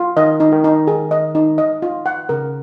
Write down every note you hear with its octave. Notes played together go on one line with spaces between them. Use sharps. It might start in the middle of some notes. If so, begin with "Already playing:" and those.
Already playing: F4
D#3 D#5
D#4
D#3
D#4
D#3 G#4
D#5
D#4
D#5
F4
F#5
C#3 A#4